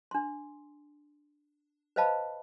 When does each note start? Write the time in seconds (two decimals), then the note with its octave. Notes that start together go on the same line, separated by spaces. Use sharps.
0.11 D4 C6
1.96 B4 C5 D#5 F5 A5 B5